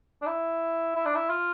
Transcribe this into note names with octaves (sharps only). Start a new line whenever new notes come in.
D4
E4
E4
D4
E4
F4